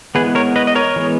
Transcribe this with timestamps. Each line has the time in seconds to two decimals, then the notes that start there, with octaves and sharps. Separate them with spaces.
0.15 E3 G#3 B3 G#4 B4
0.35 A#4 C#5
0.56 B4 D#5
0.67 D#5
0.75 A#4 C#5
0.96 E3 G#3 B3